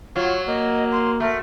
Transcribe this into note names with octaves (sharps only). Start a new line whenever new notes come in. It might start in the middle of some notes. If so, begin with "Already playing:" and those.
F#3 F4 C#5
A#3 D#5
C6
A3 A#4